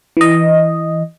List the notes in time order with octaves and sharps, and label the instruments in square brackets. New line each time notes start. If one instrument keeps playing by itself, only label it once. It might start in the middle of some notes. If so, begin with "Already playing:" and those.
[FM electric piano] E3 D#5